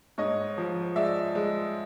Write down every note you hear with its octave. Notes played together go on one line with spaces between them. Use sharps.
G#2 C#5 D#5
F3
G#3 D5 E5
G#3